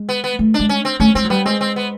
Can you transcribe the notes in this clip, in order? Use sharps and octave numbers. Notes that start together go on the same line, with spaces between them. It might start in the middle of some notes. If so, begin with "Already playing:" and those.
Already playing: G#3
B3
B3
A3
D4
G#3
C#4
C4
A3 C#4
G#3 C4
F#3
G3 B3
G#3 C4
C4
B3